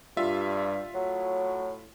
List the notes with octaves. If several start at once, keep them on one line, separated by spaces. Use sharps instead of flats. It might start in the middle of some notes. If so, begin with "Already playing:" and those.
G2 G3 F4 E5
A2 F#3